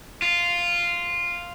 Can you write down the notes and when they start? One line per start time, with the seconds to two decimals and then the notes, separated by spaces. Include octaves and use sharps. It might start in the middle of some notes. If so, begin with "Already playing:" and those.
0.22 F4